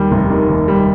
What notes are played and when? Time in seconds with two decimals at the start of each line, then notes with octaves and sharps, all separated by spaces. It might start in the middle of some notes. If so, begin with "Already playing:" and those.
Already playing: D#2 G3
0.12 F1
0.30 D#3
0.49 D#2
0.68 G3